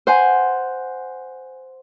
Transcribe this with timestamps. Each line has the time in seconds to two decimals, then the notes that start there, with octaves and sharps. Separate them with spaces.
0.07 C5 F#5 G#5